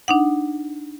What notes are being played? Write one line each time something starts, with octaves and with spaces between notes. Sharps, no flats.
D4 D#4 F#5